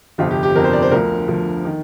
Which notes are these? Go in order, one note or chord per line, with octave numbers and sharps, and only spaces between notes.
G1 F2 C3 F4
G4
G4
G1 F2 C3 A#4
C5
D5
C5
D2 D3 F3 A#4
D2 D3 F3
D#3